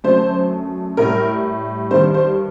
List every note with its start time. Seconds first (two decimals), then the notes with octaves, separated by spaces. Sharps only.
0.04 F#2 D3 F#3 A3 C5
0.97 A2 G3 A#4
1.91 G2 D#3 G3 C5
2.14 C5